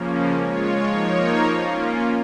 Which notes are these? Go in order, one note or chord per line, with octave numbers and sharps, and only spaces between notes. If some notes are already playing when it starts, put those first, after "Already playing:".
Already playing: C#3 F3 A#3 C#4
G#3 F4 C#5
F3 A#3 D#4 A#4 C#5
A#3 C#4 F4